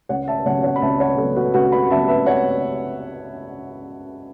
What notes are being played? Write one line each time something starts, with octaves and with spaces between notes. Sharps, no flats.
C#2 C#5 F#5
E5 A5
C#3 F#3 B3 C#5 F#5
C#5 F#5
B5
C#2 E5 A5
C#5 F#5
C#3 F#3 B3 A4
F#4 B4
C#2 F#4 B4
F#5 B5
C#3 F#3 B3 E5 A5
B4 E5
C#5 F#5